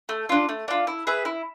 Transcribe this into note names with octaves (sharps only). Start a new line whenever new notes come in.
A3
D4 F4
A3
D4 F4
E4
G#4 B4 E5
E4